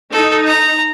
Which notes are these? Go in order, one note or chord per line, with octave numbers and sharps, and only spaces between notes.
D#4 A4
A#5